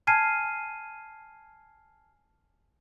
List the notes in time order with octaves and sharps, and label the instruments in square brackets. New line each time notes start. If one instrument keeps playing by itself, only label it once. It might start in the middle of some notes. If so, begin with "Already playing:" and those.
[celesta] G#5 A5 F6 G#6 C7 D#7